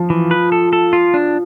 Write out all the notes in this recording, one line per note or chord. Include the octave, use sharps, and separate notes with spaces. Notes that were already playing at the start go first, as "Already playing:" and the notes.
Already playing: F3
E3
B4
A4
A4
F4
D4